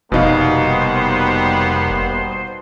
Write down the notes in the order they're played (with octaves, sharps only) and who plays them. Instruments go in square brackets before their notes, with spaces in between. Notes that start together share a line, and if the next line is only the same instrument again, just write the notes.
[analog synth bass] F1 [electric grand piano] B2 D#4 F5 [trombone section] G3 A#3 B3 [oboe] C5